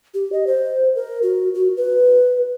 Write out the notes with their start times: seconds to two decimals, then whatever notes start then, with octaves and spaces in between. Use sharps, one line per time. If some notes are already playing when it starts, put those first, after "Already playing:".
0.14 G4
0.32 D#5
0.47 C5
0.95 A#4
1.23 F#4
1.54 F#4
1.77 B4